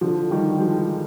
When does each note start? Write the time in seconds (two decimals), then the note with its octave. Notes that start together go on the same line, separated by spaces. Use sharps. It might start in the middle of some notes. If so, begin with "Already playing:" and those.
0.01 D3 F3
0.30 D#3 G3
0.60 F3 G#3